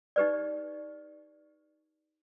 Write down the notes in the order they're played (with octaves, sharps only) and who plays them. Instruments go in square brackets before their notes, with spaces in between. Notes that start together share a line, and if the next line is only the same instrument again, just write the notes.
[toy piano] D#4 G4 B4 D5